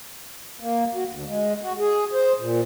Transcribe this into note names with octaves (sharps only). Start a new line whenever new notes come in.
A#3
F#4
D2
G#3
F#4
G#4
C5
A#2